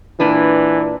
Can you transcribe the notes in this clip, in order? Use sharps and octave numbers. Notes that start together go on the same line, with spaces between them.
A#2 E3 D4 B4